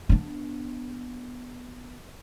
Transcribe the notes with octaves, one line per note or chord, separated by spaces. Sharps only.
B3 D4